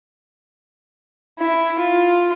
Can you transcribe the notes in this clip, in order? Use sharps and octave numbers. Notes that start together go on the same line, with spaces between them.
E4
F4